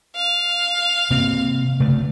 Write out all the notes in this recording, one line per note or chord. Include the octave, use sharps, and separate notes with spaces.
F5
C3 A#3 C4
C#3 A3